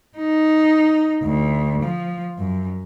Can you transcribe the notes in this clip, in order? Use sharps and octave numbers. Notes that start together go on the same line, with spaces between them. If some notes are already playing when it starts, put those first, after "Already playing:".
D#4
D2
F3
F#2